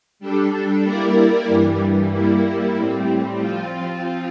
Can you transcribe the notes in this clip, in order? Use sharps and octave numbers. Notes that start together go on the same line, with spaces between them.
G3 D4 A4
G3 A#3 E4 A#4 D5
G2 E3 G3
G3 A#3 E4
A2 G3 C4
F3 C4 F4